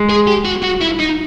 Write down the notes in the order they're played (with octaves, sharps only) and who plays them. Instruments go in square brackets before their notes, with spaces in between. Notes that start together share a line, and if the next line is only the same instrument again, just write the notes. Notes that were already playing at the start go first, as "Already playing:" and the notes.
Already playing: [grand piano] G#3
[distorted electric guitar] G#4
G4
F#4
F#4
E4
D#4